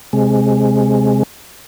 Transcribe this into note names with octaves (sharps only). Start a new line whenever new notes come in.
C3 G#3